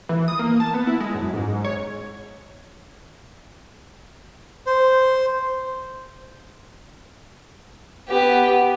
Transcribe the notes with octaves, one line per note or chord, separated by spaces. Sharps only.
E3
D#6
A#3
A5
B3
E4
G#3
F#2
G#2
C#5
C5
B3 G4